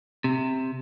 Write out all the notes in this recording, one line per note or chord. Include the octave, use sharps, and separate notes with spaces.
C3